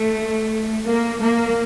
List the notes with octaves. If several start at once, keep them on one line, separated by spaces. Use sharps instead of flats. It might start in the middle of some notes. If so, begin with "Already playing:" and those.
Already playing: A3
A#3
A#3